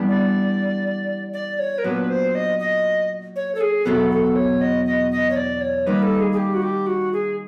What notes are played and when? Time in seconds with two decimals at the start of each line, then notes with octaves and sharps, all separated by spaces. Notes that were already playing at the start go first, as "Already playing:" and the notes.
Already playing: E3 G3 B3 D4
0.08 D5
1.33 D5
1.59 C#5
1.78 A#4
1.84 A#2 F#3 B3 D4 B4
2.10 C5
2.35 D#5
2.59 D#5
3.36 C#5
3.55 A4
3.61 G#4
3.85 E2 B2 F#3 B3 A4
4.11 A4
4.36 C#5
4.61 D#5
4.85 D#5
5.11 D#5
5.30 C#5
5.36 D5
5.61 C#5
5.86 D#3 G3 A#3 D#4 B4
6.03 A4
6.20 G#4
6.32 G#4
6.37 G4
6.54 F#4
6.62 G4
6.87 F#4
7.13 G#4